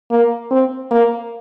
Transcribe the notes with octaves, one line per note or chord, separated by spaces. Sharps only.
A#3
C4
A#3